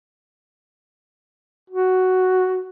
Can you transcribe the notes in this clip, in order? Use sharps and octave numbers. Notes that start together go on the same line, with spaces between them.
F#4